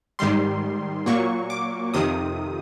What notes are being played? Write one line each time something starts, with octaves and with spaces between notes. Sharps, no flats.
G#2 D#3 G3 C6
A#2 F#3 A#3 C#6
D6
F2 C3 D#3 D#6